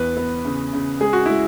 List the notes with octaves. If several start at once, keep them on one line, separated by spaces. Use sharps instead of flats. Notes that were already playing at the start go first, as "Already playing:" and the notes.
Already playing: E2 B4
B3
C#3
C#3
G#3 G#4
F#4
G#3 E4